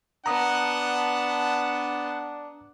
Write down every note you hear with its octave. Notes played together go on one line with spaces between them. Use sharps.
B3 D4 F#5 A5 A#5 D#6